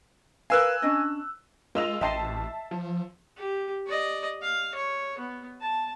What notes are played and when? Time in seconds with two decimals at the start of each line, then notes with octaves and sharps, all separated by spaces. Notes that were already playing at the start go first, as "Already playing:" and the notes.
0.50 A#4 B4 F5 G#5 E6 F#6
0.82 C#4 D4 D#5
1.75 G#3 F4 A#4 D#5 E6 F7
2.01 A1 D#5 E5 G5 A5 C6 C7
2.71 F3
3.37 G4
3.86 D5 D#5
4.42 F5
4.74 C#5
5.18 B3
5.61 A5